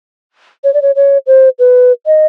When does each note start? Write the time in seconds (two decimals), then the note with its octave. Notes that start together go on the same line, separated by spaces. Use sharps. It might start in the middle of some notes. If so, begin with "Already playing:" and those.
0.64 C#5
0.74 D5
0.82 C#5
0.96 C#5
1.27 C5
1.59 B4
2.06 D#5